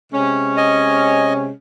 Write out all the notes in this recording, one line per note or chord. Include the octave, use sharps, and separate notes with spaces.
C3 G#3 C#4
D#5 G#5